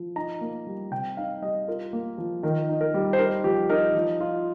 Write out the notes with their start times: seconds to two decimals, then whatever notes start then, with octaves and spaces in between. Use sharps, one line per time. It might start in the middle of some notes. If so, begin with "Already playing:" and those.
Already playing: F3
0.16 D#4 A#5
0.41 A#3
0.67 G3
0.91 C3 G5
1.17 D#4 F5
1.42 G3 D#5
1.68 F4 A#4
1.93 A#3
2.18 F3
2.43 D#3 A#4
2.69 D#4
2.81 A#4
2.94 G3
3.13 C5
3.19 D#4 A#4
3.44 F3 G4
3.69 D#4 A#4
3.95 F3
4.20 F4